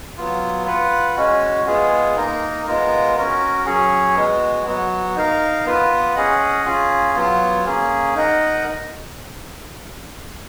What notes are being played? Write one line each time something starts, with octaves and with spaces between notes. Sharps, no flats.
F#3 B3 F4
F4 B4 F#5
G#3 C#4 F#4
G#3 B3 F4 G#4
A#3 D#4 A#4
G#3 B3 F4 A#4
C#4 F#4 A#4
F#3 C#4 G#4 C#5
G#3 B3 F#4
F#3 B3 F#4
D#4 A#4 F5
B3 F4 B4
C#4 G#4 D#5 F#5
C#4 F4 G#4
F#3 B3 F4
A#3 C#4 G#4
D#4 A#4 D#5 F#5